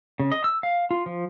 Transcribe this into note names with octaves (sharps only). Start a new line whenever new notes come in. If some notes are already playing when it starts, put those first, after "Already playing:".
C#3
D#5
E6
F5
F4
F3